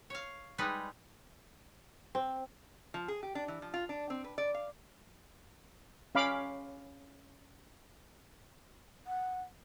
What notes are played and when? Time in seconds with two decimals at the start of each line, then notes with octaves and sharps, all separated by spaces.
0.10 C#5 F5
0.58 G3 G#3 D#4 B4
2.15 C4
2.94 F3
3.08 G#4
3.23 G4
3.35 D4
3.48 E3
3.62 F3
3.74 F4
3.89 D4
4.10 C4
4.24 B4
4.38 D5
4.54 F5
6.15 C#4 F5 B5 D6
9.06 F#5